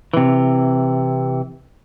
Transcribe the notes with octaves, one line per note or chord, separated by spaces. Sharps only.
C3 E3